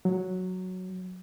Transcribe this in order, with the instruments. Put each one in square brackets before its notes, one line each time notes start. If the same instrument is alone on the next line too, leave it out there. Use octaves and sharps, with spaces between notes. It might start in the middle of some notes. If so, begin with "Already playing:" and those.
[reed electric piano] F#3